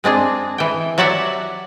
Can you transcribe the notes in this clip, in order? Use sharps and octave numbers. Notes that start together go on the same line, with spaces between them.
G#3 C4 D4 G#4
E3 G5
F#3 F#4 G4 D5 E5 F#5